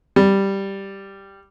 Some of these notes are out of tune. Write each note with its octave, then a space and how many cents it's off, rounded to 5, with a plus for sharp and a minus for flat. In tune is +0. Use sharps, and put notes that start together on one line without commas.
G3 +0